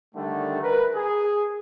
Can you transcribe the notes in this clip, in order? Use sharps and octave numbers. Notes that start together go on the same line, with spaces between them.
D3 D#3 G3 A3
A#4 B4
G#4